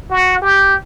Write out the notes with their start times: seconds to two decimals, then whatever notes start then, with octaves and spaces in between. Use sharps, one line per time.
0.10 F#4
0.42 G4